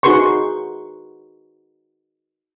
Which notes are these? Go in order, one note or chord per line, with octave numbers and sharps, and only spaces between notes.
D#4 F#4 G#4 B4 C6 C#6